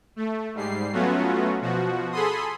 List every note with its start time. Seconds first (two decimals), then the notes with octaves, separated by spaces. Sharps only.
0.16 A3
0.54 G#2 G3 C7
0.93 F#3 A3 B3 C#4 F4 F#4
1.61 B2 F3 F#4
2.11 G#4 A4 B5 C6 D#6